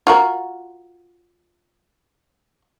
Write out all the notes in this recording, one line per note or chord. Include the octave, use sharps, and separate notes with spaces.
F4 F#4 A#4